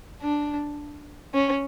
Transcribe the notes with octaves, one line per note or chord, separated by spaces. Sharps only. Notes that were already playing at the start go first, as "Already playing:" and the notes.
D4
C#4